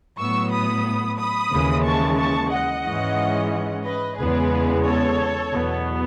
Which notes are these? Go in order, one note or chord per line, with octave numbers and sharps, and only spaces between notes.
A2 F#3 B3 C#6 E6
B5 D#6
B5 D#6
D#2 C#3 E3 G#3
A5 C#6
A5 C#6
D#5 F#5
G#2 E3 G#3 C#4
B4 D#5
E2 C#3 G#3 B3 G#4 B4
A4 C#5
E2 B2 F#3 B3